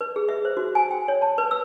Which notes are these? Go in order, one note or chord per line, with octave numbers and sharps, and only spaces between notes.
B4
G#4
E5
C5
F#4
G#5
G5
C#5
A5
B4
E6